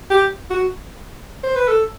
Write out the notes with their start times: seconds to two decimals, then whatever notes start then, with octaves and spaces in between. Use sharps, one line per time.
0.10 G4
0.50 F#4
1.43 C5
1.56 B4
1.68 A4